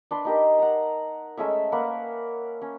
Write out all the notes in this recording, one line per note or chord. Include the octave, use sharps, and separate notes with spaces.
D4 B4 C6
D#4 G4 A#4
F#5 A#5
G#3 A3 C#4 E5
A#3 A#4 B4 F#5
C#4